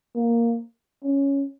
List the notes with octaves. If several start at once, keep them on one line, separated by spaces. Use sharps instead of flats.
A#3
C#4